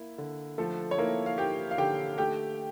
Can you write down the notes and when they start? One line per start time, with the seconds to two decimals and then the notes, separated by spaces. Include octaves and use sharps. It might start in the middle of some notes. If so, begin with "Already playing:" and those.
Already playing: A#3 E4
0.18 D3
0.58 F3 A3 A4
0.91 C#5
0.98 A#3 E4 A#4
1.26 F5
1.38 A#3 G4 G5
1.71 F5
1.78 D3 G4 G5
2.18 A3 G4 G5